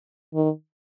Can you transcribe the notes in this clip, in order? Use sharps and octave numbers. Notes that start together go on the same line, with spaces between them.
D#3